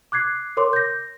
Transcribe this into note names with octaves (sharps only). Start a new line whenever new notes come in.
D6 F#6 G#6 C7
A#4 C#5 C6 D6
G6 A#6